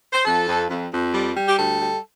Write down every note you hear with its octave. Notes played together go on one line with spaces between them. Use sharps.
C5
F2 A4
F2
F2
F2
G3
G3
G4
D2 A4
G3